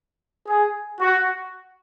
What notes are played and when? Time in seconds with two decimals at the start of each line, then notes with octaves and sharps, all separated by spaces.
0.48 G#4
1.00 F#4